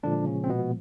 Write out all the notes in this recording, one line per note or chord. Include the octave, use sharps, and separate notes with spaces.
A#2 D3 F3 G#3 D4
C#3 C#4
C4
B2 B3